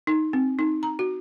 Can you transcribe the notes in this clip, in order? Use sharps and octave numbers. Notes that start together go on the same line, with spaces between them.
D#4
C4
D#4
A#5
F#4